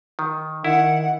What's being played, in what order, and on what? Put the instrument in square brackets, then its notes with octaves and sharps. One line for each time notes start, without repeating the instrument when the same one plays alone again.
[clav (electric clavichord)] D#3
[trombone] D#3 [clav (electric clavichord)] E4 [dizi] F#5